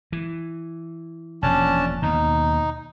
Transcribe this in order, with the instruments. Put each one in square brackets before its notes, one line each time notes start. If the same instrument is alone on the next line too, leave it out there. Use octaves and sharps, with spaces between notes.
[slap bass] E3
[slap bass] E1 A#2 F3 [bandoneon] C#4 D4 A5
[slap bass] D#2 B2 [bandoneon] D#4